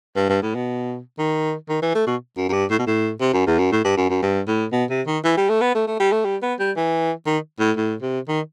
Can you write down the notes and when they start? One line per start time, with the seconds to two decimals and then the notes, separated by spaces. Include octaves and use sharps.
0.16 G2
0.29 G2
0.42 A2
0.55 B2
1.19 D#3
1.69 D#3
1.82 E3
1.95 A3
2.07 B2
2.37 F#2
2.49 F#2
2.53 G2
2.70 A2
2.79 B2
2.87 A2
3.20 C3
3.33 F#2
3.47 E2
3.59 F#2
3.72 A2
3.84 G2
3.97 F#2
4.10 F#2
4.22 G2
4.48 A2
4.72 B2
4.90 C3
5.07 D#3
5.24 E3
5.37 G3
5.49 A3
5.61 B3
5.75 A3
5.87 A3
6.00 G3
6.12 A3
6.25 G3
6.42 B3
6.59 G3
6.76 E3
7.26 D#3
7.60 A2
7.77 A2
8.02 C3
8.28 D#3